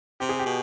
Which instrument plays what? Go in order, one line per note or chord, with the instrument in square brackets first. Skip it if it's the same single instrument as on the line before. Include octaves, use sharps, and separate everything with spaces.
[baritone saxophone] C3 [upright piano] G4
[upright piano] G#4
G4
[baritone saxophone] B2